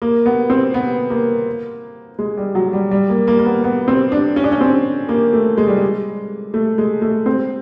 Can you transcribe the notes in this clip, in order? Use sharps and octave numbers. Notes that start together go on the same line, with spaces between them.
A#3
B3
C4
B3
A#3
G#3
G3
F#3
G3
G3
A#3
A#3
A#3
B3
B3
C4
D4
C#4
D4
C#4
C4
A#3
A3
G#3
G3
G#3
A3
G#3
A3
C4